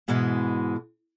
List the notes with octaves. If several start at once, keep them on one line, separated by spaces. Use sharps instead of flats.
G#2 B2 E3 G#3